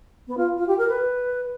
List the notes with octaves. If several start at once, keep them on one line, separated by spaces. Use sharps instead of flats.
B3
F4
F4
G4
A#4
B4